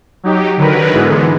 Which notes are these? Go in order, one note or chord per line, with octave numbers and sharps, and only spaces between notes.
F#3 D#4 G4
D3 D#3 F#3 A#4 B4
G#2 D3 E3 G#3 B3